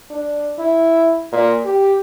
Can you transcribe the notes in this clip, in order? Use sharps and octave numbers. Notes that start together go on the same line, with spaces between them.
D4
E4
A#2
G4